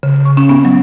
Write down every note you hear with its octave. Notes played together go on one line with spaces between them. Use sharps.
C#3
C#6
C#4
B3
F#3